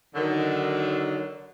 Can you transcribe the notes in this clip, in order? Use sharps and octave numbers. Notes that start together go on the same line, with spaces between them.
D3 D#3 F#3